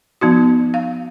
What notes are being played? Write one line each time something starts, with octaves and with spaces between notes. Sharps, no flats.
F3 B3 D#4 F#4
F5